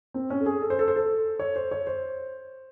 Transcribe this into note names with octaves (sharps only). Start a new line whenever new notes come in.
C4
C#4
A4
G#4
A4
C5
A4
C5
A4
C#5
C5
C#5
C5